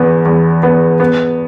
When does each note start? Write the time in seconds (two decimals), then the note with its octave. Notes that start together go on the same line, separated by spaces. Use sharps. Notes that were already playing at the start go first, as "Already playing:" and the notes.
Already playing: E2 B3
0.25 E2
0.63 B3
1.00 B3